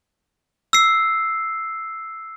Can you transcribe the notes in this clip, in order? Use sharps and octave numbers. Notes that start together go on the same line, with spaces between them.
E6 C7